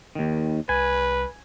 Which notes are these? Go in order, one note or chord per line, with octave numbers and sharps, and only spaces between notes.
D#2 D#3
C2 B4 G#5